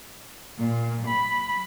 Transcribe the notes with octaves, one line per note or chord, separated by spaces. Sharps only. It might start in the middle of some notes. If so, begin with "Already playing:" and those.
A#2
B5